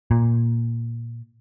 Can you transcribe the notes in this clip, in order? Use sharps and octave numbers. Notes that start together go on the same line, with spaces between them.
A#2